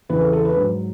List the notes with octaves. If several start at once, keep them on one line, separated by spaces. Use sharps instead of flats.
E2 C#3 E3 B4
A4
A4
B4
G#2 F#3